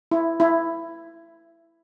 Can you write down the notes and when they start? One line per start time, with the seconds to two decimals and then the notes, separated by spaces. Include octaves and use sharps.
0.12 E4
0.40 E4